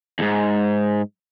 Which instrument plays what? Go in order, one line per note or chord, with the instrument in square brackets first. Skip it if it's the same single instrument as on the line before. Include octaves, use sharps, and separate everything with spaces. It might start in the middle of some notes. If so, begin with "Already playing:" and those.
[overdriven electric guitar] D#2 G#2